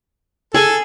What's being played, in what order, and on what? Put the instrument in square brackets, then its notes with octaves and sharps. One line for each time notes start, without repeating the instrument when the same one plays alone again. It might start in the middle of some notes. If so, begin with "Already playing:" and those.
[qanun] G#4 G#5 [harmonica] A4